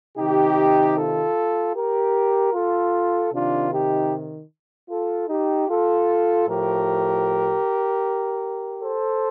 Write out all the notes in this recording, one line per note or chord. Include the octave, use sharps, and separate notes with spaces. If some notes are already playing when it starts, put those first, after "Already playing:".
C3 D#3 D#4 G4
F4 A4
G4 A#4
F4 A4
C3 D#3 D4 F4
D#4 G4
F4 A4
D#4 G4
F4 A4
A2 F3 G4 A#4
A4 C5